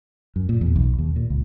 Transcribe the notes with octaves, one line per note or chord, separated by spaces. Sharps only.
F#2
A#2
E2
B1
D#2
A#2
C#2